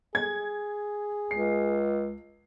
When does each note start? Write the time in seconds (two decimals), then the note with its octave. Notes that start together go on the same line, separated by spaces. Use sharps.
0.15 G#4 G#6
1.31 C#2 C7